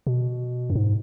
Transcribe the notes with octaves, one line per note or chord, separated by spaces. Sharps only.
B2
F#2
G#2